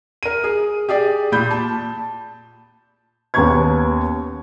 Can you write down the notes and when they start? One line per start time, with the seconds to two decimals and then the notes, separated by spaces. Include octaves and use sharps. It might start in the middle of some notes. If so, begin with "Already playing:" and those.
0.23 A#4 D#7
0.44 G#4
0.89 G4 G#4 D5
1.32 A#2 B5 G6
1.51 A5
3.34 D#2 B3 C#4 A#5 C#6 G#6